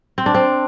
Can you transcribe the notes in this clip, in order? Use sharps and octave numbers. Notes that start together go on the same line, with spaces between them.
C4
D4
C4